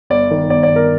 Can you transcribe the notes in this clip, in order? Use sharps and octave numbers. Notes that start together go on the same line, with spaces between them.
G1 D5
D#3
G1 D5
D5
G1
A#4